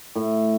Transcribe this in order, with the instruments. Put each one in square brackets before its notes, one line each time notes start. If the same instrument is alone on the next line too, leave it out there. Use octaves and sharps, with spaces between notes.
[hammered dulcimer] A2